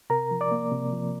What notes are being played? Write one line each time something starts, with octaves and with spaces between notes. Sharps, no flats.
C3 A#4 A#5
F3
D5 D6
A#3
C3
F3